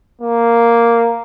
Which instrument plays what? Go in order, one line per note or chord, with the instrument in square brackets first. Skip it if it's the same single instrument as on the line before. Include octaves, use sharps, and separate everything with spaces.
[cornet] A#3